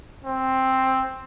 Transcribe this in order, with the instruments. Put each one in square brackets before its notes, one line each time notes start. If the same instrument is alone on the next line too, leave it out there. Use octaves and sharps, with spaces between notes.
[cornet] C4